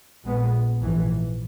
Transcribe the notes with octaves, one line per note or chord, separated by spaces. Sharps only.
A#1 A#2 G#3 B3
A#1 G#2 E3